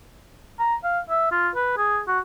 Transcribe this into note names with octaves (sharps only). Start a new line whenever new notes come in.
A#5
F5
E5
F4
B4
G#4
F#4